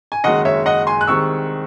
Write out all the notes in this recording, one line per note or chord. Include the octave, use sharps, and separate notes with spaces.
G#5
F#1 F#2 D#3 G#3 D#5 F#5
C#5 E5
D#5 F#5
G#5 C6
F#6
C2 C3 D#3 G#3 C4 C#6 E6